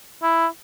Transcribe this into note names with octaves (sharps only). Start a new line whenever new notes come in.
E4